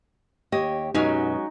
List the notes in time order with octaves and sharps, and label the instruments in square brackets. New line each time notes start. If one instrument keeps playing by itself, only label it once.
[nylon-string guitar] D#2 G4 C#5 [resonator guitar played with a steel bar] D#5
[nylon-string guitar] F#2 B2 [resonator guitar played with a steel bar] F#3 G#3 C#4 [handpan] D#4